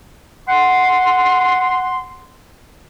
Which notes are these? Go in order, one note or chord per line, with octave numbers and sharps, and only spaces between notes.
F#5 C6